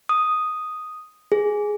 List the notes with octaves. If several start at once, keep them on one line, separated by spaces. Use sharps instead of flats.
D#6
G#4